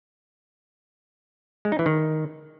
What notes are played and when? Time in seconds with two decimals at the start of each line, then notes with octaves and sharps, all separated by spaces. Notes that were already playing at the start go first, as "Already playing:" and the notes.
1.65 G#3
1.72 D#4
1.79 E3
1.86 D#3